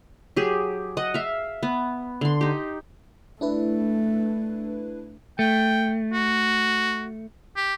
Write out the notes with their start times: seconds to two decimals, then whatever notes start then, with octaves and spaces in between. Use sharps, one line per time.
0.36 F#3 G4 G#4
0.97 D#5 F#5
1.14 E5 F5
1.63 B3
2.21 D3 C6
2.41 D#4 G4
3.41 A3 D4 E4 B4
5.39 A3 G5
6.13 F#4
7.56 G4